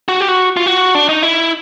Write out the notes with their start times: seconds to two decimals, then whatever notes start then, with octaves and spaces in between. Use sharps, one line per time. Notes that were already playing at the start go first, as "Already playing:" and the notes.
0.08 F#4
0.21 G4
0.28 F#4
0.57 F4
0.66 F#4
0.95 D4
1.09 D#4
1.23 E4